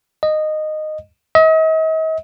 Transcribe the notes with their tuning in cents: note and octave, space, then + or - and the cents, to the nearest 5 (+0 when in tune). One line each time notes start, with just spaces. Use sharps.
D#5 -15
D#5 +40